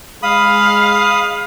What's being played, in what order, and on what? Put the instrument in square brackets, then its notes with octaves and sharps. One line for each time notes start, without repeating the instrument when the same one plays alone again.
[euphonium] G#3 [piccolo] F5 [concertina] B5 D#6